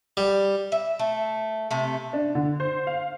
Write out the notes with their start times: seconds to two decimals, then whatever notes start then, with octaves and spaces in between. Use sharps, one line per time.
0.17 G3
0.72 E5
0.99 A3
1.71 C3 A3
2.13 D4
2.35 D3
2.60 C5
2.87 F5